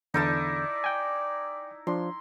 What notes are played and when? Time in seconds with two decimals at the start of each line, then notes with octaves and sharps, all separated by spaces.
0.14 E2 D3 D#4 E4 D5 A5
0.84 G5 G#5
1.87 F3 D4 C6